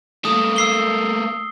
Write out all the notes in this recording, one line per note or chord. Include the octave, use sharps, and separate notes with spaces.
A3 A#3 D#6
E6 C7 G7